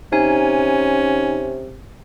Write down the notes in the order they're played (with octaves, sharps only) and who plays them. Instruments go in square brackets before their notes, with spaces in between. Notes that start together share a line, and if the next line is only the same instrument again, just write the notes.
[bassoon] C3 [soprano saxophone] C#4 [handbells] D#4 G#5